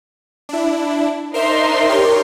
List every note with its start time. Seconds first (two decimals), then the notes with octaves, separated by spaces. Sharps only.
0.49 D4 E4
1.34 D4 D#4 A#4 C5 E5 C6
1.89 G4 A#4 C#5